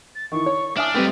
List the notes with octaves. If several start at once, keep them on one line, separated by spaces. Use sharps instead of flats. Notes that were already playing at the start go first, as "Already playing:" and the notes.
A6
D#3 E3 C#6
C#5
D4 E5 G#5 D#6 F6
G3 A3 C4 D#4 G4 B4 C5 G5